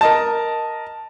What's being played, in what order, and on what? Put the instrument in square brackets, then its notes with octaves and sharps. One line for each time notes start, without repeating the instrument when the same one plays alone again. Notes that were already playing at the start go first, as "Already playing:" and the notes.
[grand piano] A#4 D#5 A5